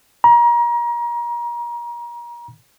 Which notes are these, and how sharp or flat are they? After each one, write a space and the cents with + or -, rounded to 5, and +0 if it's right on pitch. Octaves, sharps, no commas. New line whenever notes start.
A#5 +30